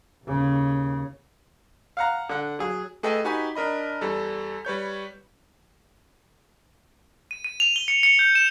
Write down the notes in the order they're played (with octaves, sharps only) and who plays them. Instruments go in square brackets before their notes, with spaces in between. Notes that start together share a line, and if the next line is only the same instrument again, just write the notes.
[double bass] D#2 C#3
[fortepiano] F5 F#5 A#5
D3 F#5
F#3 G#4
[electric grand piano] A3 G#4 A4 B4 D#5 G5
D#4 F#4 G4 B4 G#5 B5
D4 A#4 D#5 B5
E2 G3 A4
G3 B4 C#5 G6
[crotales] D#7
D#7
F7
G7
C#7
C#7
G6
E7